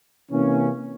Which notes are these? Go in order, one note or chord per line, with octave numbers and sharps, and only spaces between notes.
C3 E3 A#3 C#4